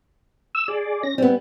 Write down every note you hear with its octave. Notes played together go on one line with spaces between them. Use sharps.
E6
G#4 D5
C#4 A#6
G3 B3 C4